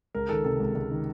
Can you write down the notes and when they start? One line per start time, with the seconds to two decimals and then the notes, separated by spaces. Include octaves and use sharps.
0.15 C#2 A#4
0.29 D#3 A4
0.44 C3 A4
0.60 C#2
0.75 C#2
0.91 D#3